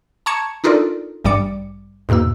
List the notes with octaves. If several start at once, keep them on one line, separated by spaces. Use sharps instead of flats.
A5 A#5 C#6 G#6 C#7 E7
D4 D#4 F4 A4 A#4 D5
A1 G2 G3 D5 D6 C#7
E2 G#2 B2 A#3 E6